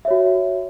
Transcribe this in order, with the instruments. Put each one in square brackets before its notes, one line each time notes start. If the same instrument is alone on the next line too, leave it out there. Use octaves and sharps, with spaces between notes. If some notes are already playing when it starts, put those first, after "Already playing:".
[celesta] E5
C#5
F#4